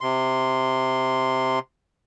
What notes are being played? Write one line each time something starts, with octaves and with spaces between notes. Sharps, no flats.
C3 C6